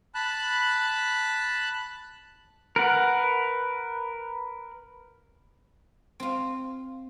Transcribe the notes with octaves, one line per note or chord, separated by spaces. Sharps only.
A5 B5 F#6
A#4 B4 F#5
C4 F4